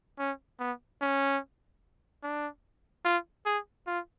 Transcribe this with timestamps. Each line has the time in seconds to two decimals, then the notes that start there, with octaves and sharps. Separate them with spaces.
0.19 C#4
0.59 B3
1.01 C#4
2.23 D4
3.05 F4
3.46 G#4
3.87 F4